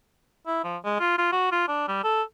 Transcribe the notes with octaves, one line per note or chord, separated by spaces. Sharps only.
E4
F3
G#3
F4
F4
F#4
F4
D4
G3
A4